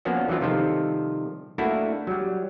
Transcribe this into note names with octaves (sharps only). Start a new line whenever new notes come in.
F3 A#3 B3 C#4 D4 F#4
E3 F#3 C4 F4
C3 D#3 F3 G3 F4 A4
A3 A#3 D4 E4 F#4
F#3 G3